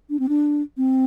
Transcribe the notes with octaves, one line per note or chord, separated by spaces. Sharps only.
D4
C4
D4
C4